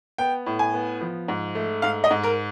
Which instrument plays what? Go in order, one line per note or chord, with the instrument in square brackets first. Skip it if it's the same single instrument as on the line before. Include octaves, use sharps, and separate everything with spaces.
[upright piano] B3 G5
A2
G#5
B3
F3
G#2
A3
G#2 F5
D#5
G#2
A#4